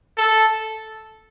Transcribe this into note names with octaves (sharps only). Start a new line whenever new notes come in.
A4